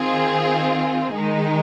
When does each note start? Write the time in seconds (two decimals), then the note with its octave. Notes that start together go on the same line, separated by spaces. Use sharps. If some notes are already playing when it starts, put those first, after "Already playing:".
Already playing: D#3 C4 F4 G#4
1.15 D#3 G#3 D#4